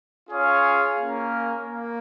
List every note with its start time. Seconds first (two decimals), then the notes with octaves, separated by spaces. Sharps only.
0.29 C#4 F4 G#4 C#5 F5
0.99 A#3 C#4 A#4
1.69 A#3